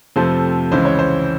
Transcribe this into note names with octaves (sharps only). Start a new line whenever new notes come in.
F2 C3 F3 A3 C5
C#2 C#3 E3 G#3 C5
C#5
C5